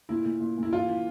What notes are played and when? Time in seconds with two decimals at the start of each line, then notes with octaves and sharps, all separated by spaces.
0.09 A#2 E4
0.25 A#2
0.40 A#2
0.57 A#2
0.63 E4
0.72 E3 F4
0.88 E3